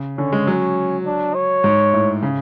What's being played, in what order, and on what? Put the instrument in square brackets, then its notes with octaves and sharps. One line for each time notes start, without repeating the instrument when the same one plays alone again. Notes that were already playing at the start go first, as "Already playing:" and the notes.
Already playing: [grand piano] C#3
[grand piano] D3 [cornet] C#4
[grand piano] G#3
F#3
[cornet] D4
C#5
[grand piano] G#2
A2
C#3